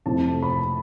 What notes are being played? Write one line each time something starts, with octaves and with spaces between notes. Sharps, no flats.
F2 C3 E3 A3 A5
B5